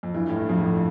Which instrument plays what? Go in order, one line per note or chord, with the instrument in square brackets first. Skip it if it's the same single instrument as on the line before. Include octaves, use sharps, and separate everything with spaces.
[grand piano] F2
[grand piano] G2 [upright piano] E3
[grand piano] A2
G2
[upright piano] F2
[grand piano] A1 A2